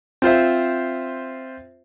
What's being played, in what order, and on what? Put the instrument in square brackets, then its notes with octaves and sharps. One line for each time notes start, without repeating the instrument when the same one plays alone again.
[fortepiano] C4 F4 C5 E5